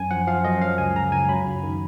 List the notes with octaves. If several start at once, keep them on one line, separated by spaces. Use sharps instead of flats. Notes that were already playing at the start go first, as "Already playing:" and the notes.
Already playing: F#2 G#5
F3 F#5
F3 F5
F#2 D#5
F#3 F5
C#2 G#5
C#3 A#5
C#2 G#5
F#3 B5
F#2
D#3